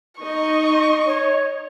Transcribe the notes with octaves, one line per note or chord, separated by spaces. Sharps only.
D#4 D#5 C#6
C#5